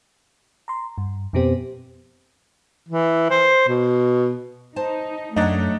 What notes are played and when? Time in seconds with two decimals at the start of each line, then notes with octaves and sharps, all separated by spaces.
0.68 A#5 C6
0.98 G2
1.33 F2 B2 B3 C4 G4 C5
2.89 E3
3.30 C5
3.68 B2
4.76 D#4 C5 A5
5.36 F#2 F#3 A3 D4 D#4 C#5 F#5